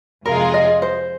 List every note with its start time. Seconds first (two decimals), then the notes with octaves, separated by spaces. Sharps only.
0.25 F2 C3 G#3 F4 G#4 A#4
0.54 D#5
0.82 C5